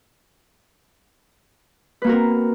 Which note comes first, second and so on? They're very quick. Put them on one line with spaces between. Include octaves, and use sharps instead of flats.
B4 A#3 F#4 A#4 C4